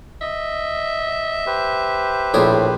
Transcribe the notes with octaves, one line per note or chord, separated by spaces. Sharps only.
D#5 E5
G4 B4 C5
A#1 A2 G#4 D5